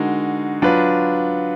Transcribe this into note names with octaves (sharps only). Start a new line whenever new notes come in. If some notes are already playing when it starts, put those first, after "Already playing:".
Already playing: D3 G#3 D#4 F#4 A#4
F#3 D4 F4 B4